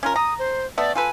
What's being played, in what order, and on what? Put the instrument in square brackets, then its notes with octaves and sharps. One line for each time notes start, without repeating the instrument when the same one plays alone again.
[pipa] C#4 F4 A#4
[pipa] A#5 [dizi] D#6
[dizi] C5
[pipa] A3 B3 A4 [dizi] D5
[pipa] F4 A4 B4 [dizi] G#5